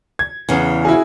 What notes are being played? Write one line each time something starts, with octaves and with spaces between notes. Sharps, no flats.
G#6
E2 C#3 E3
E4 F#4 G#4